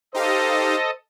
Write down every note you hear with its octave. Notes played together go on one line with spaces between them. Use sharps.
D#4 G4 A4 C5 D#5 F5